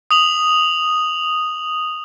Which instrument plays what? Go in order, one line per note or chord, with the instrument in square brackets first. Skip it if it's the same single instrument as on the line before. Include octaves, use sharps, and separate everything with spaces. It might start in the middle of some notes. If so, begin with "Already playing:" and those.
[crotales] D#6 F7 F#7